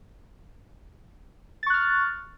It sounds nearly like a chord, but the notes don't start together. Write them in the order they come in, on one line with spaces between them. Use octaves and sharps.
A6 C#6 F#6 F6